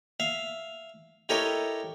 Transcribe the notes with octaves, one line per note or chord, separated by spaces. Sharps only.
E5 F5
E4 G4 A4 A#4 C#5 D#5